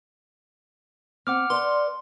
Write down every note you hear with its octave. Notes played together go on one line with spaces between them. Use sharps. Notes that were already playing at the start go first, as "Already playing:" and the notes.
C4 F#5 D6 F6
B4 D5 C6